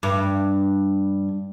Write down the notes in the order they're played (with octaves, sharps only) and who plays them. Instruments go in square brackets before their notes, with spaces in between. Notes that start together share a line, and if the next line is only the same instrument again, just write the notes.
[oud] G2